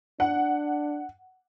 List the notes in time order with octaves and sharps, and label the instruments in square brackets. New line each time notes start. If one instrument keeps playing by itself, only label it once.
[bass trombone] D4 [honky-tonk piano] F#5